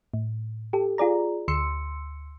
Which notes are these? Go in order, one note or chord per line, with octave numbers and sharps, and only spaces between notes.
A2
G4 A4
F4 G#4 D5 A#5
D2 C6 E6 C#7